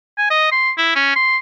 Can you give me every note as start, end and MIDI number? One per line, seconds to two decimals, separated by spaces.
0.18 0.28 80
0.30 0.49 75
0.52 0.71 84
0.78 0.91 64
0.96 1.14 61
1.16 1.38 84